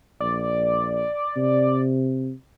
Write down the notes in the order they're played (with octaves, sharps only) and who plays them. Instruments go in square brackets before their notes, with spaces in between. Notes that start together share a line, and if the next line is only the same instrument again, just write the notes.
[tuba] A#1 [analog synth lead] D5
[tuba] C3